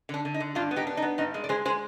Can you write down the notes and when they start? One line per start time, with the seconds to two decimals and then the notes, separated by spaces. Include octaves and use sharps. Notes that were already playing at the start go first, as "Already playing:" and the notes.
0.09 D3 D4
0.25 D3
0.34 D#4
0.40 D3
0.55 G2 D4 F4
0.71 B3
0.76 D#4 G4
0.87 D4
0.97 D#4
1.02 B3
1.18 G2 D#4
1.34 G#3
1.44 D5
1.49 G#3 G#4 C5
1.65 G#3 G#4 C5